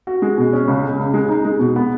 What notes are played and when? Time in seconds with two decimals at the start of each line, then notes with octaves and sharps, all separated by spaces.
0.07 F#4
0.22 G#3
0.37 B2
0.53 C#4
0.68 C#2
0.83 C#3
0.99 C#2
1.14 G#3
1.29 D#4
1.45 G#3
1.59 B2
1.76 B3